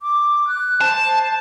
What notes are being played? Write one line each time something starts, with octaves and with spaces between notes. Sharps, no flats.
D6
F#6
C5 A5